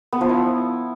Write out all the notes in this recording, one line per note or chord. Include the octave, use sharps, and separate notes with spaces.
B3
F3
E4